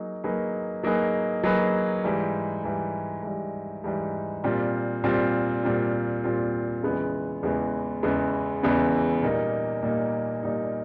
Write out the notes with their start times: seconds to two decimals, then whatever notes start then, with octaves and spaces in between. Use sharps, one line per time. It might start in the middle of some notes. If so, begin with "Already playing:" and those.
Already playing: F#3 A#3 D#4 G#4
0.24 F#3 A#3 D#4 G#4 B4
0.83 F#3 A#3 D#4 G#4 B4
1.44 F#3 A#3 D#4 G#4 B4
2.04 G#2 E3 G3
2.64 G#2 E3 G3
3.23 G#2 E3 G3
3.84 G#2 E3 G3
4.44 A#2 G3 C4 F4
5.04 A#2 G3 C4 F4
5.63 A#2 G3 C4 F4
6.24 A#2 G3 C4 F4
6.83 E2 C#3 E3 G#3 B3
7.43 E2 C#3 E3 G#3 B3
8.03 E2 C#3 E3 G#3 B3
8.63 E2 C#3 E3 G#3 B3
9.23 A#2 G3 A#3 D#4
9.83 A#2 G3 A#3 D#4
10.43 A#2 G3 A#3 D#4